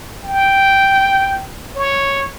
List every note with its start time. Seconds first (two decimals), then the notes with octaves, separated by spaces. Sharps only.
0.24 G5
1.76 C#5